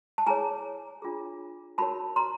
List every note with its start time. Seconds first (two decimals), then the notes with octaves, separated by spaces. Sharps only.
0.18 A5
0.26 E4 G#4 C#5 G#5 A#5
1.02 D4 F4 G#4
1.78 D#4 F#4 A#4 C#5 A5 B5
2.16 A#5 C6